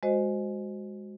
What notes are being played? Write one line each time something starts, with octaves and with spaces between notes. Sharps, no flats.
G#3 F#4 C5 D#5